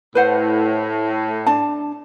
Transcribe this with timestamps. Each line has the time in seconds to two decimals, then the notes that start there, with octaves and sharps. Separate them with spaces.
0.15 A2 B4 C5 F#5
1.47 D4 A5